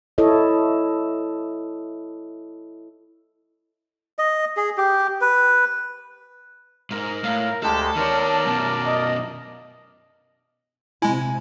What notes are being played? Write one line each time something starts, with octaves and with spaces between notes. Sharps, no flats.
E4 A4 C#5 D#5
D#5
G#4
G4
B4
G#2 A#4
A2 F5
D2 G#3 G4 A4 A5
D#3 A#4 C#5 D5
F#2 B2
D#5
C3 G#3 E4 G#5